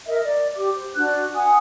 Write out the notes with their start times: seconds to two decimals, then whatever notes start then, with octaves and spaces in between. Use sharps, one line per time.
0.07 A#4 D#5 E5
0.25 D5
0.57 G4 D6
0.76 C5
0.96 D4 F#4 F#6
1.35 F#5 G#5 D#6